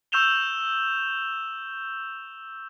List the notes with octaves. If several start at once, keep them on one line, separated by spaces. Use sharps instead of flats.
C#6 E6 G6 E7 F7 G7